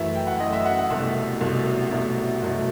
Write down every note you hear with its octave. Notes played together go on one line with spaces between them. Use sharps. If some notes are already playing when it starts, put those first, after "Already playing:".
Already playing: F#2 E3 A3 E5
G5
F#5
F#2 E3 A3 D#5
E5
F#5
F#5
C2 B2 F#3 A3 E5
C2 B2 F#3 A3
C2 B2 F#3 A3
C2 B2 F#3 A3